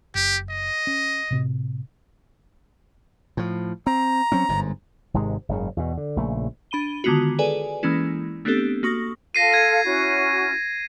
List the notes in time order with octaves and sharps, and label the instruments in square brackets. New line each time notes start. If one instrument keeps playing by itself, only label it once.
[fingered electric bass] F#1 [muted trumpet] G4
[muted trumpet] D#5
[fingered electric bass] C#4
A2 C3
[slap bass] A2 F3
[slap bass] C4 [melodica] A#5
[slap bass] F#3 C4 C#4
G1 G#2
G#1 G#2 C3 G#3
F#1 G#2 C#3
E2 B2
D3
A#1 A#2 C#3 A3
[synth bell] D4 B5 D#7 G7
D3 D#3 G#3 B3 F4 F#4
G#4 A4 B4 D5 G#5
E3 G#3 A#3 C#4 E4
A3 B3 C4 D4 G4 A4
A#3 F#4 C#6 D#6 A#6
[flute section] F4 A4 F5 [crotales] A#6 C7 D#7
[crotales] G#6 D#7
[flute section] C#4 E4 F#4